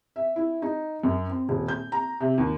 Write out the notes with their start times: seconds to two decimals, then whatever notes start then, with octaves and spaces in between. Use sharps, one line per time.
0.16 E5
0.36 E4
0.62 D#4
1.03 F#2
1.30 C4
1.49 D#1
1.68 G6
1.92 A#5
2.20 C3
2.38 D#2